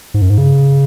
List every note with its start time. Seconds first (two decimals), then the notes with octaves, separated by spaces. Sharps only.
0.14 G#2
0.22 F#2
0.30 G#2
0.38 C#3